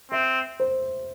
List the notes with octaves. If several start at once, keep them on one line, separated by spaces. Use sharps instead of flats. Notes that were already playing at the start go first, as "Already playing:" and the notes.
C4 E5
C5